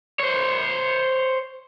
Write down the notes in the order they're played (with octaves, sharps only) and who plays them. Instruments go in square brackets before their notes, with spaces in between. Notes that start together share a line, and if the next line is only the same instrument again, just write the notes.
[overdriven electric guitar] C5 C#5